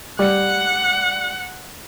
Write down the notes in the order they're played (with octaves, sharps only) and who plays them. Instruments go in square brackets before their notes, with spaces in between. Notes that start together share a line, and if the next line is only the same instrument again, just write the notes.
[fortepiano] G3 [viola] F#5